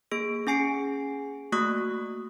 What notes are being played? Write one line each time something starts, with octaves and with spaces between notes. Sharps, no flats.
A#3 G#4 D7
C#4 G#4 G#5 C7 D7
A3 A#3 F#4 C#6 D#6 F#6